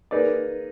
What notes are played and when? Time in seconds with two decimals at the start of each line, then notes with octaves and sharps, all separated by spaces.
0.11 A#3 D#4 G#4 B4 D5